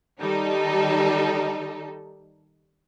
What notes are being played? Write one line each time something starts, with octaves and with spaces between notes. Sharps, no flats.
D#3 G3 D#4 A4